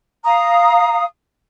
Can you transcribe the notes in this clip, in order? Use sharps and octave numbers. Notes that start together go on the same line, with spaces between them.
F5 A#5 D#6